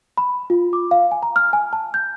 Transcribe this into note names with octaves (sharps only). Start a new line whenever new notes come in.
B5
F4
D6
F5
G#5
A#5
F6
G#5
A5
G6